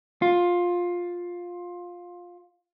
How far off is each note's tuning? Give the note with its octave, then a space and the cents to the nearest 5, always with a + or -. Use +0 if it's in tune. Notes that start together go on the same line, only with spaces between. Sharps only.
F4 +15